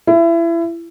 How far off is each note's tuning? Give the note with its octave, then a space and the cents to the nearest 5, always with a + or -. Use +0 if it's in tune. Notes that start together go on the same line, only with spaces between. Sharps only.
E4 +25